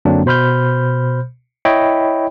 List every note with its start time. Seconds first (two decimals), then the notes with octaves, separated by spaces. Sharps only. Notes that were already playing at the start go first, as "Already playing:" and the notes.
0.05 F#2 D3 F#3 A#3 C4 D4
0.26 B2 C5 B5 F6 G6
1.65 E4 C#5 D#5 E5 G5 B5